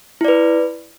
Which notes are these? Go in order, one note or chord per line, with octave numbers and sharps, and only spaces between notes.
E4 B4 D5